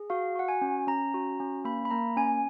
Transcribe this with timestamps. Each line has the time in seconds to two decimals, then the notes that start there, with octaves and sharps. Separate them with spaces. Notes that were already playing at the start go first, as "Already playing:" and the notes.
Already playing: G#4
0.10 F#4 F5
0.36 F#4 F#5
0.48 G#5
0.62 C#4
0.87 C#4 A#5
1.14 F#4
1.40 C#4
1.65 A#3 B5
1.85 B5
1.91 A#3 A#5
2.16 C#4 G#5